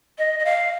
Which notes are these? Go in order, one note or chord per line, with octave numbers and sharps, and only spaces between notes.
D#5
D#5
F5